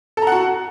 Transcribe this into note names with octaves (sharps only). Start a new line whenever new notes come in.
F#4 A4 F#5 A#5